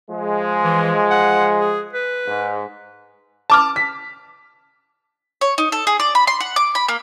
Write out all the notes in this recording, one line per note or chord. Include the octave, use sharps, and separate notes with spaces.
F3 G#3
E3
F#5
G#4
B4
G#2
A5 D6 F6
B6
C#5
D#4
A4
G#4
D5
B5
C6
F#5
D6
B5
A#3